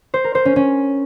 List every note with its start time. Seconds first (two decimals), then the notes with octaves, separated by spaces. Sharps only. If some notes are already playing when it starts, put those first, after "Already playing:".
0.14 C5
0.24 A#4
0.35 C5
0.45 C#4
0.56 C#4